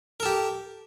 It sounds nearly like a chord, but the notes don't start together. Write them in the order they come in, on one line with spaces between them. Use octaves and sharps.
A#4 A4 G4